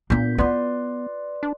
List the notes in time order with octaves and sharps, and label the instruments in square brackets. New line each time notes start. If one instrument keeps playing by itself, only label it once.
[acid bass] A#2 [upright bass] B3 D4 [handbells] G6 B6
[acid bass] B3 [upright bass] E4 F4 [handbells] B4 D5 C6
[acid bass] D4